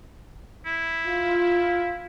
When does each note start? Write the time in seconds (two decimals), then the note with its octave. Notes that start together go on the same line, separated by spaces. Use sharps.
0.66 E4
1.07 F4